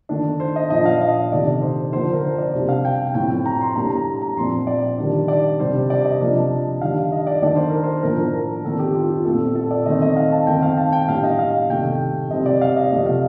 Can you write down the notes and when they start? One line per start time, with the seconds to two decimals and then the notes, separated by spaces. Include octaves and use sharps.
0.09 D#3 A3 D4
0.40 C5
0.56 D#5
0.70 A#2 F3 A#3 D4 D#5
0.85 F5
1.01 D#5
1.32 C3 D#3 A3 D4 D5
1.47 D5
1.62 C5
1.92 D3 F3 A#3 D4 C5
2.13 A#4
2.24 C5
2.38 D5
2.54 C3 G3 D4
2.69 F5
2.84 G5
3.14 A2 F3 C4 G5
3.46 A#5
3.61 C6
3.76 A2 G3 A#3 D4 A#5
3.91 A#5
4.22 A#5
4.37 A#2 F3 C4 C6
4.67 D5
4.98 D#3 G3 D4
5.28 D5
5.60 C3 G3 D4 C5
5.90 D5
6.05 D#5
6.20 C3 F3 A#3 D4
6.81 D#3 G3 D4 F5
7.12 D#5
7.27 D5
7.42 D#3 A3 D4 D5
7.56 C5
7.70 A#4
7.83 C5
8.03 A2 F3 A#3 D4 A#4
8.34 A#4
8.65 D#3 A3 C4 A4
8.79 G4
8.94 F4
9.11 F4
9.25 A#2 A3 C4 A4
9.55 A4
9.71 D5
9.86 D#3 A3 C4 D#5
10.02 D#5
10.17 F5
10.32 A5
10.47 D#3 A3 C4 G5
10.62 F5
10.77 A5
10.92 G5
11.08 A2 G3 D4 F5
11.23 D#5
11.39 F5
11.69 C3 D#3 A3 G5
12.30 C3 G3 C4 D#5
12.46 D5
12.61 F5
12.76 D#5
12.91 C3 F3 A3 D#5
13.06 F5